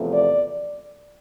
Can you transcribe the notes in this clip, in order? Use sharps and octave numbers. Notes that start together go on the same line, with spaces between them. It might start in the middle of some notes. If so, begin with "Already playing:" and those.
Already playing: E2 C3 F3 A3
D5